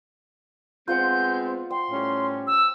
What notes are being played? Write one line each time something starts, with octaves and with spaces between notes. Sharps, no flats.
G#3 B3 C4 F4 C5 F#5 G6
G5 C6
A2 G3 C#4
E6